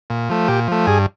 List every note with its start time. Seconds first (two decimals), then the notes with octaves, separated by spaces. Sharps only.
0.10 A#2
0.29 F3 A3
0.48 A#2 G4
0.68 F3 A3
0.87 G2 G#4